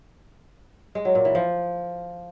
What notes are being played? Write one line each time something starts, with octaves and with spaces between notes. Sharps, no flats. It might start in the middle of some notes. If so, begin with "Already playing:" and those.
G#3
F#3
A#2
E3
F3